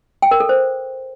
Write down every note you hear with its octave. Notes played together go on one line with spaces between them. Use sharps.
G5
A#4
A4
C5